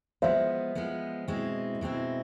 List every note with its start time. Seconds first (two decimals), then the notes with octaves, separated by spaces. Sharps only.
0.22 F3 G#3 B3 C5 E5
0.75 F3 G#3 B3
1.28 B2 G#3 C4 E4
1.81 B2 G#3 C4 E4